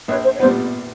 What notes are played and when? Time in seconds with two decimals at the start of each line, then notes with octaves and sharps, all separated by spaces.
0.08 A#1 B4 C#5
0.24 C5
0.36 C#5
0.40 A#2 G3 B3 C5